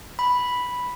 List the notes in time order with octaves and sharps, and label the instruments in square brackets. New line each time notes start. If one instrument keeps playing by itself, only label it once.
[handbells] B5